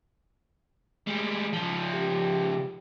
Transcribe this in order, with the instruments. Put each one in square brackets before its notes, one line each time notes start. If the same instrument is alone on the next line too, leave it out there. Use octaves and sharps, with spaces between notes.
[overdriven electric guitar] G3 G#3
C#2 F3
[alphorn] G4